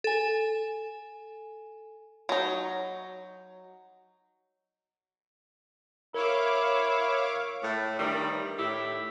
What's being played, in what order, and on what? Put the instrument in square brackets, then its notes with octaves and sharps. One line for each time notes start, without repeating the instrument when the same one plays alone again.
[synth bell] A4 G#5
[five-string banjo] F#3 D#4
[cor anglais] E4 [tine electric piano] A#4 [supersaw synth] C#5 F5 D6
[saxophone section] A2
G2 D#3 E3 G3
A2 E4 G4